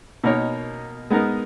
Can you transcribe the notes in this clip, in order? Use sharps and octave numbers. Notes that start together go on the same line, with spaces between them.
B2 A#3 D#4 A#4 C#5
G#3 B3 D#4 A#4